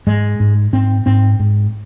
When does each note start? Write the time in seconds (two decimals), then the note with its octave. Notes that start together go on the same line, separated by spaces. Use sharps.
0.07 G#2 G#3
0.40 G#2
0.73 G#2 C4
1.06 G#2 C4
1.40 G#2